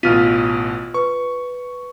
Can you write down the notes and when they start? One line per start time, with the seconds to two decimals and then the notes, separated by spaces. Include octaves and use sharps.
0.03 A1 B2 F4 F6 B6 D#7
0.94 B4 C#6